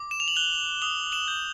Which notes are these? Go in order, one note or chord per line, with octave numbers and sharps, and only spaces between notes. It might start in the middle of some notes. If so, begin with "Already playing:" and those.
Already playing: D6
E7
F7
F#7
F#6 F7 G7
D#6 F7 G7
E7 F#7
G6